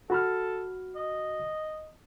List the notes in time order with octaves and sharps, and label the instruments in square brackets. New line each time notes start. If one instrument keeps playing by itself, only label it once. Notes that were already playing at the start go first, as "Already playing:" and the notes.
[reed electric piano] F#4 B5 F6 [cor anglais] A4
[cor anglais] D#5